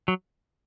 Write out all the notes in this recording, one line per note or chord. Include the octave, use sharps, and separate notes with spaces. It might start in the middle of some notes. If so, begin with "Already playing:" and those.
F#3